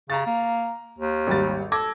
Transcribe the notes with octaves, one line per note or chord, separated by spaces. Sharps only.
C#3 A#5 A6
A#3
D#2
G#1 G3 A6
A4 D6 G#6 A#6